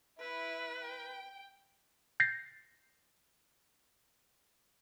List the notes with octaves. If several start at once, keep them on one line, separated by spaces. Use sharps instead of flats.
E4 B4
G5
G6 A6 A#6 C7